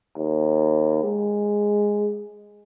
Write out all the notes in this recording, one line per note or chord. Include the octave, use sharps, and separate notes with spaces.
D#2
G#3